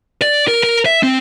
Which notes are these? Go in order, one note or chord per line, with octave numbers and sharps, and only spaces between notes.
D5
A#4
A#4
E5
C4